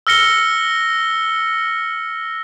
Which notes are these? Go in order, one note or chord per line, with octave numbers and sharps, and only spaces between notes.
E6 F6 A#6 C#7 G7